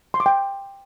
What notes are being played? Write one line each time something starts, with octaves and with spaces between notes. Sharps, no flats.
C6
D6
G5